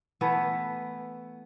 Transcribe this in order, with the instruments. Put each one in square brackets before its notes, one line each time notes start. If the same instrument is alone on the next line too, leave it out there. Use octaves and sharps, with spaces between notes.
[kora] E3 A3 B3